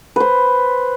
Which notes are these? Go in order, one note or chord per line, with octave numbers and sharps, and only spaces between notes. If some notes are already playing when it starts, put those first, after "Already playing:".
B4 C5